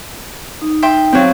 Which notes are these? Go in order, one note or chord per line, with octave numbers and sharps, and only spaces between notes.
D#4
E5 G5 C6
F#3 C4 C5 F5